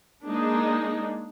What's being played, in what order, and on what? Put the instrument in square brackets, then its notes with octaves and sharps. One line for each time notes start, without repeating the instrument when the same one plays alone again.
[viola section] G#3 A#3 D4 D#4 G#4